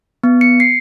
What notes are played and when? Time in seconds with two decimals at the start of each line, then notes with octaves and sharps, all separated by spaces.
0.24 B3
0.41 C#7
0.60 C7